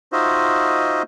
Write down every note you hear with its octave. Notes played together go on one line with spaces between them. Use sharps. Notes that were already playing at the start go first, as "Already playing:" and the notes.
D#4 F4 F#4 C5 D#5 E5